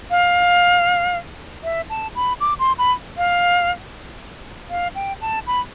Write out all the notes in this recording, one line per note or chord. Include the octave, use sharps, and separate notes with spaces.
F5
E5
A5
B5
D6
C6
B5
F5
F5
G5
A5
B5